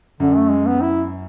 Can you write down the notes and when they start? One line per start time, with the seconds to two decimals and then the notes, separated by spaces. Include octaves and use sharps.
0.20 F#2 D3
0.36 A3
0.51 G#3
0.66 B3
0.82 E4